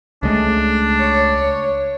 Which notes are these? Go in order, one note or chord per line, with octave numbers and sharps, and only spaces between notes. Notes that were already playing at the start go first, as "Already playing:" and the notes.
C#2 G#3 A3 D4
C#5